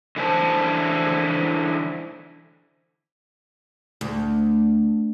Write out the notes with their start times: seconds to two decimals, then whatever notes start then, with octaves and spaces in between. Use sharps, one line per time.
0.16 D3 E3 E4 C5 A5
4.01 D2